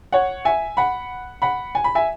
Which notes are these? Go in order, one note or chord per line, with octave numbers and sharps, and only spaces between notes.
C#5 F#5
E5 G#5
F#5 B5
F#5 B5
G#5
B5
E5 G#5